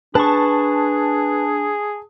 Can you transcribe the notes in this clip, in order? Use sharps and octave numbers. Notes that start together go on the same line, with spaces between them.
D4 G#4 B4 A5 C#6